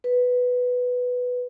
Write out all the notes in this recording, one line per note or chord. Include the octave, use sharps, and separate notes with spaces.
B4